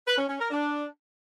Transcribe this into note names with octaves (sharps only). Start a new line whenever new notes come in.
B4
C#4
C#4
A#4
D4